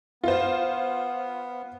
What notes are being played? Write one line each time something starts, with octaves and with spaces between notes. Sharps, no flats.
B3 F4 C5